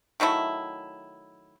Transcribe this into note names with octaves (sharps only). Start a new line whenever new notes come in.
D#3 F#3 A3 E4